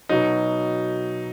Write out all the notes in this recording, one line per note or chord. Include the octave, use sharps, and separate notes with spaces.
B2 F#3 D#4